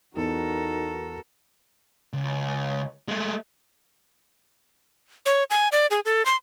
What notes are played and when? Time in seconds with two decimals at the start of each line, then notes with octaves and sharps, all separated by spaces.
0.16 E2 D#4 F#4 A4 A#4
2.13 C#2
3.08 G#3 A3
5.26 C#5
5.50 G#5
5.72 D5
5.91 G#4
6.05 A4
6.26 C6